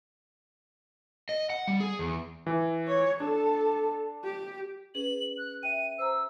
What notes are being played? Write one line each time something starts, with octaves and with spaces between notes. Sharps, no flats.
D#5
F#5
G3
G#4
E2
E3
C#5
D4 A4
G4
C#4 G#4 B4 F#7
F#6
E5 G5 D#7
C5 A#5 E6